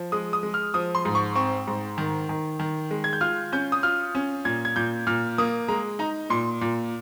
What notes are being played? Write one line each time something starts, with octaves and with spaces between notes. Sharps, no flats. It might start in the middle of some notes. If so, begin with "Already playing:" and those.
Already playing: F3
G#3 D#6
D#6
G#3
F6
F3 D#6
C6
G#2
C#6
C4 C#6
G#2
D#3
D#3
D#3
G#3
G#6
G6
F4 F6
C#4 G6
D#6
F4 F6
C#4
A#2 G#6
G#6
A#2 G6
A#2 F6
A#3 D#6
G#3 A#5
D#4 A#5
A#2 C6
A#2